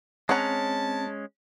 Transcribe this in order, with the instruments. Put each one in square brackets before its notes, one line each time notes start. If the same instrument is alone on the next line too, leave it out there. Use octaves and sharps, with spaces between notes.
[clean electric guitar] G#3 C#4 [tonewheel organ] C4 [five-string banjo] C#5 F#5 A#5 [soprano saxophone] A5